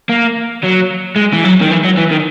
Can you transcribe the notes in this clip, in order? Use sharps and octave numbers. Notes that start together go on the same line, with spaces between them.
A#3
F#3
G#3
E3
F#3
D#3
E3
F#3
E3
D#3